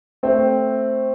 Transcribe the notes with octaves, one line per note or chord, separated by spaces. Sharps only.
A3 C4